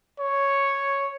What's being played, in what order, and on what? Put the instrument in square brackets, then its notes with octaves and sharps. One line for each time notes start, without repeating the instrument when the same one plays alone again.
[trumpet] C#5